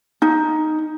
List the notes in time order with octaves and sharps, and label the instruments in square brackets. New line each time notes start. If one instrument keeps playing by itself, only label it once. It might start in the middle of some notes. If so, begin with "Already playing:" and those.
[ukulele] D#4